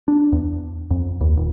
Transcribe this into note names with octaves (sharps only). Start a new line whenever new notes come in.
D4
E2
F2
D#2
D#1